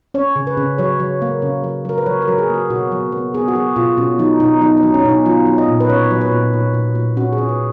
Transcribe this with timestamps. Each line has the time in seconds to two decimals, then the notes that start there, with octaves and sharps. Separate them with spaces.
0.14 C#4 C#5
0.36 C#3
0.47 B4
0.57 C#3
0.78 F#3 C#5
1.00 F#3
1.22 A#3
1.42 C#3
1.64 F#3
1.85 F#3 A#4
1.98 B4
2.06 F#3 C#5
2.22 A#4
2.28 F#3
2.38 G#4
2.49 A#3 F#4
2.70 B2 F#4
2.92 F#3
3.12 B3
3.34 B3 G#4
3.48 F#4
3.55 F#3 G#4
3.76 B2 F4
3.97 B2 C#4
4.19 F#3 D#4
4.40 B2 D#4
4.61 F#3 D#4
4.77 D#4
4.83 F#3
4.94 C#4
5.05 B2 D#4
5.26 F#3 F4
5.46 F#3
5.58 D#5
5.68 A#2
5.80 B4
5.90 C#4 C#5
6.11 F#3
6.21 B4
6.32 A#2
6.53 A#2
6.74 A#2
6.95 A#2
7.17 C#4 F#4
7.32 G#4
7.38 C#4
7.49 B4